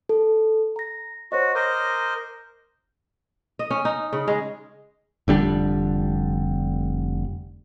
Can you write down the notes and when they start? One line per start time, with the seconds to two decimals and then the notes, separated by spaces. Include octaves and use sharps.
0.09 A4
0.76 A#5 A#6
1.32 F#4 C5 C#5 D#5
1.55 A#4 C5 D#5 D6
3.59 D#5
3.70 C#4
3.85 D#4
4.13 C#3
4.28 G#3
5.28 F1 D3 G3 D4